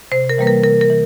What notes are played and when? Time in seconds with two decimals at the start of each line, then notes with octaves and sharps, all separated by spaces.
0.12 C3 C5
0.29 A#4
0.38 E3 G3 A#3 B4
0.47 A#4
0.64 C3 A#4
0.81 A#4
0.90 E3